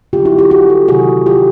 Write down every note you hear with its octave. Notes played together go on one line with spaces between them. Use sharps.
D3 F#3 B3 F4 G4
E4 F#4
F4 G4
F#4 G#4
G4 A4
C3 D#3 F#3 B3 F#4 G#4
F4 G4